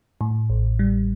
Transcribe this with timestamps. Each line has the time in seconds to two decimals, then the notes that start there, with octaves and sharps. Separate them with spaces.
0.21 A2
0.50 A1
0.79 G3